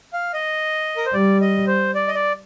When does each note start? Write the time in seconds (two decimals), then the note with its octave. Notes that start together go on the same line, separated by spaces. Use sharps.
0.13 F5
0.34 D#5
0.97 A#4
1.06 C5
1.14 G3 D5
1.41 D#5
1.67 C5
1.95 D5
2.08 D#5
2.14 D5